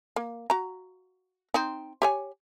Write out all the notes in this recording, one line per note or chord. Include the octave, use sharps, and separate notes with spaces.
A#3
F#4 A#5
C4 D#4
G4 C#5 G#5